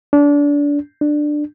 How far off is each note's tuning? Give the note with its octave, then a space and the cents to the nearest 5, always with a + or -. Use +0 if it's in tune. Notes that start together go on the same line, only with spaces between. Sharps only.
D4 -25
D4 +15